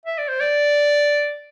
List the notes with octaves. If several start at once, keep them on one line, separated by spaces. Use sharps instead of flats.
E5
D5
C5
D5